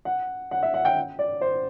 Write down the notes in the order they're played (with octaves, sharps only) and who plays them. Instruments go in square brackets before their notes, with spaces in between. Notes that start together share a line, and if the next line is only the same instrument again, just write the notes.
[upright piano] F#5
F#5
E5
F#5
G5
D5
C5